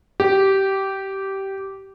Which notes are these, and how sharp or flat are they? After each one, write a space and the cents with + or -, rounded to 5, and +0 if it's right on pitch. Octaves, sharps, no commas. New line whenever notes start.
G4 -15